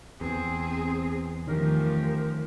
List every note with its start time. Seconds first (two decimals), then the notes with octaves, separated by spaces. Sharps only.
0.21 E2 C4 G#4
1.47 D#3 F3 A3 C#4 G4 A#4